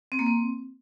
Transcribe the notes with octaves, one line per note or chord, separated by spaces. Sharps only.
C4
A#3
C4